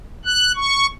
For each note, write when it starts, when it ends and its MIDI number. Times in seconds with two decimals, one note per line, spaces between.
0.25 0.52 90
0.56 0.87 85